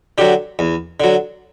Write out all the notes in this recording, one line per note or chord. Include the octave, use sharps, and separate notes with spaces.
D3 F#3 G4
E2
D3 F#3